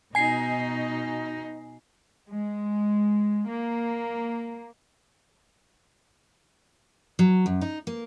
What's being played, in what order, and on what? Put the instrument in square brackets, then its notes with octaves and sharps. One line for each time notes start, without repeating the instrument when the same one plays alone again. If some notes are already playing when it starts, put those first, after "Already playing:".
[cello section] B2 D#4 [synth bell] G#5 C7
[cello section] G#3
A#3
[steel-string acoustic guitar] F#3
F#2
D#4
A#3